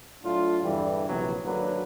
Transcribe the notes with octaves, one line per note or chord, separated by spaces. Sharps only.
A2 F#3 D4 F4
E2 G2 D3 E3 G3
A#1 C3 E3 F#3 B3
G#1 D3 F#3 A#3 B4